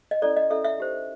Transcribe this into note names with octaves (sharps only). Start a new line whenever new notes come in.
D#5
C#4 E4 A4 D5
D#5
C#4 E4 A4 E5
E5
D#4 G4 C5